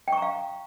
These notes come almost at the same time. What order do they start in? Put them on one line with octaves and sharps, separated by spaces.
G5 C#6 A#5 F5